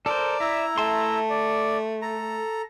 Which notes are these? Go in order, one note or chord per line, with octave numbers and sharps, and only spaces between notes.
A4 A#4 C5 D5
E4 E5 A#5
A3 A5 C6
D5
A4 A#5